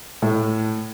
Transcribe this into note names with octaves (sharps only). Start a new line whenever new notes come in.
A2